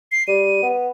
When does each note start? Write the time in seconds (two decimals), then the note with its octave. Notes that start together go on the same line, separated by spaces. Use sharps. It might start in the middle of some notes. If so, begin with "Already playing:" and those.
0.12 C7
0.28 G3 D#7
0.63 B3